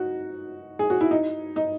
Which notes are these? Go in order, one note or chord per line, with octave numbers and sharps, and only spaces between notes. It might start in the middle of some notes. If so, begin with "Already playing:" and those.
Already playing: D#4 F#4
G#4
F#4
E4
D#4
D#4